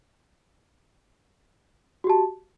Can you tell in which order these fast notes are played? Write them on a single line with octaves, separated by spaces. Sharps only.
F#4 G4 A5